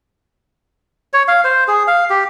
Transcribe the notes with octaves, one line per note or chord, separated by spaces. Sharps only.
C#5
F5
C5
G#4
F5
G4